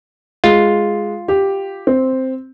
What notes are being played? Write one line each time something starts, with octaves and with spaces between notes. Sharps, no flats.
G#3 F4
G4
C4